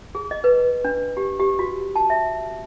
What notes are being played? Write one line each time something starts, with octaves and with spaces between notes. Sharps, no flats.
G#4
D#5
B4
D4
G4
G4
F#4
A5
E5